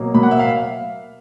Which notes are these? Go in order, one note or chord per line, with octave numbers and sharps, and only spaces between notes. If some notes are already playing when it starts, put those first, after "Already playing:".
Already playing: B2 F#3 A#3
B2 F#3 A#3 B5
F#5
E5
F5